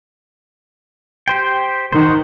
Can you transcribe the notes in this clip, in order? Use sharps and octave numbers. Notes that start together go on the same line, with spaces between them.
G4 C5 G5
D#3 F#4 C5